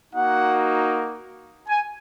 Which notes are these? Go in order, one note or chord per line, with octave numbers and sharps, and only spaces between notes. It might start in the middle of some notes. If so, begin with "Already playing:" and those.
A#3 D#4 F#4 F#5
G#5